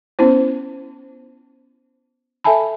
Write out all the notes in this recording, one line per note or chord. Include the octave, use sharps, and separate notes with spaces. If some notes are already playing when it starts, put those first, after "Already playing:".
B3 C#4 E4 C5
A4 E5 G#5 A5 B5